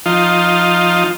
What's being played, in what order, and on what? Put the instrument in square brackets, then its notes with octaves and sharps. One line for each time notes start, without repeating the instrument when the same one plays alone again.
[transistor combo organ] F3 D#4 F4